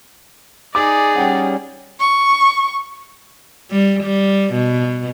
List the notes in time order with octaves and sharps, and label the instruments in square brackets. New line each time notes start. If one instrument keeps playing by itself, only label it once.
[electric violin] D#4 D5 [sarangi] G#4 [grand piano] D6
[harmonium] G3 C#4 [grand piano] F#5 G5
[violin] C#6
[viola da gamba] G3
G3
B2